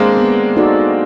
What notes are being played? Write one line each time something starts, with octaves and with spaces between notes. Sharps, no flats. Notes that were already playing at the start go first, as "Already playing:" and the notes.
Already playing: G#3 A#3 C4 D4
B3
D#4 F#4 A4 D5